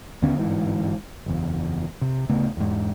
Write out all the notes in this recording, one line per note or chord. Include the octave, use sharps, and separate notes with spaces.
D#2 D3 B3 C#4
G1 G#2 E3
F#1 E2
C3
D1 C#3 A3 B3
E2 G#2